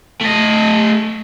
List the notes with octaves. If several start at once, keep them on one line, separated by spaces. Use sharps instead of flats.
A3 D#5